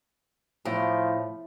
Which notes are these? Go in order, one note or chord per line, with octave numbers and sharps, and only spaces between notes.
A2 F3